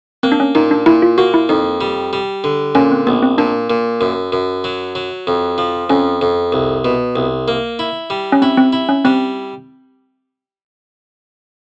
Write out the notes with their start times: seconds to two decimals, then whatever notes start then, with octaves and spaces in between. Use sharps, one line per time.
0.23 A#3 C4
0.32 D4
0.40 C#4
0.55 A#2 D#4
0.71 D4
0.86 A#2 E4
1.02 F4
1.18 A#3 F#4
1.34 E4
1.49 F2 D#4
1.81 G3
2.13 G3
2.44 D3
2.75 A#2 C#4
2.92 C4
3.07 A#1 B3
3.22 C4
3.38 A#2 D4
3.70 A#2
4.01 F#2
4.32 F#2
4.64 F#3
4.95 F#3
5.27 F2
5.58 F3
5.90 F2 C#4
6.21 F2
6.52 C2
6.85 B2
7.16 C2
7.48 A#3
7.79 E4
8.10 G3
8.32 C#4
8.42 C4 E4
8.58 C4
8.73 E4
8.89 C#4
9.05 G3 C4